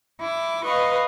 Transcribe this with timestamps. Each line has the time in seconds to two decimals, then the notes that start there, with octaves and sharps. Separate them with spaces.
0.21 E4 D6
0.66 B4 D#5 F5 C#6